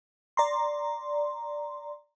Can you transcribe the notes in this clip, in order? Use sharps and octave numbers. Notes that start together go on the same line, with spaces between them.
D5 A#5 C6